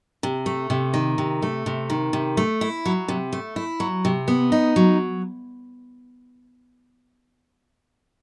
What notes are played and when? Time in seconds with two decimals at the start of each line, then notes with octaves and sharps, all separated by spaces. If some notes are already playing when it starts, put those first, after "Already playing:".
0.23 C3
0.46 A3
0.70 C3
0.94 D#3
1.18 C3
1.42 A3
1.66 C3
1.90 D#3
2.13 C3
2.37 A3
2.61 E4
2.85 F#3
3.08 C3
3.33 A3
3.56 E4
3.80 F#3
4.05 C3
4.28 B3
4.52 D#4
4.76 F#3